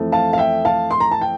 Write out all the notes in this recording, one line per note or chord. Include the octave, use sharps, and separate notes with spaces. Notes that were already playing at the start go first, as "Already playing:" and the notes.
Already playing: F2 E3 A3
F5 A5
F5
E5 G5
F5 A5
C6
A#5
A5
G5